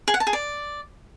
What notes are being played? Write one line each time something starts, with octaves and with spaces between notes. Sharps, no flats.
G#4
F#5
A5
G#4
D5